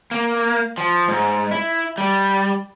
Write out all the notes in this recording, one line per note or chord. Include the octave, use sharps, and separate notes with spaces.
A#3
F3
G#2
E4
G3